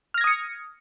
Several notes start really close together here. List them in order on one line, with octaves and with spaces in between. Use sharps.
F6 A#6 G#6 D#6 C#7